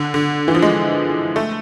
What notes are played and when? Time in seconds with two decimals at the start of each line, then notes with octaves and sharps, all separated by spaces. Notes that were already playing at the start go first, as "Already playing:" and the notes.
Already playing: D3
0.14 D3
0.48 E3
0.55 F3
0.62 G#3
1.36 A3